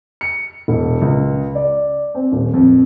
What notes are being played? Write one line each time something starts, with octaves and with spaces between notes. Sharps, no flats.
C#7
E1
C#2
D5
C4
D#1
F2